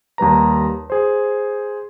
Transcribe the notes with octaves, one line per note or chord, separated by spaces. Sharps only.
D#2 G3 B4 A#5
G#4 C5